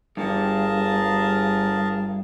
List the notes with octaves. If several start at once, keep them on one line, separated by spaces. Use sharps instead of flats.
G1 G2 G#4 A#4 A5